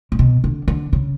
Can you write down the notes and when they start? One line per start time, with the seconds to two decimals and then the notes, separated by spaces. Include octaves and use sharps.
0.12 A2
0.19 B2
0.44 D3
0.68 D3
0.93 C#3